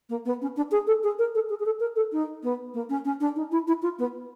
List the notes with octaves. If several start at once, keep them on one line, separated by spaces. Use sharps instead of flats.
A#3
B3
C#4
D4
G#4
A4
G#4
A#4
A4
G#4
G#4
A4
A#4
A4
D#4
B3
A#3
C#4
C#4
D4
D#4
E4
E4
F4
B3